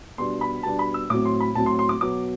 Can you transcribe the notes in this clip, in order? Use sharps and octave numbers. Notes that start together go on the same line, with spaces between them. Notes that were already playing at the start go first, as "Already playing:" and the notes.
B2 G3 B3 D4 C6
B5
B2 G3 B3 D4 A5
B5
E6
A2 F#3 C4 D6
C6
B5
A2 F#3 C4 A5
C6
C6
D6
B2 F#3 B3 D6